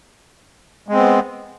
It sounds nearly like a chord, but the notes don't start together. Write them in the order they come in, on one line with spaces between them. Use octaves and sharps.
G#3 C4 B3